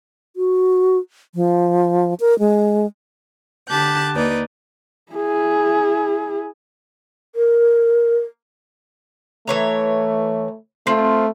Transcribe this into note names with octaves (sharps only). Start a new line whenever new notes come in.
F#4
F3
A#4
G#3
D3 G4 A5 F#6 G6
D#2 D#4 B4 D5
E4 G#4
A#4
E3 A3 C#5 A#5
A3 C4 F4